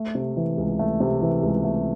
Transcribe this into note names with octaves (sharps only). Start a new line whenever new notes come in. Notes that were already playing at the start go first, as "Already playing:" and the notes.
Already playing: A3
C3
E3
C#2
A3
C3
E3
C#2
A3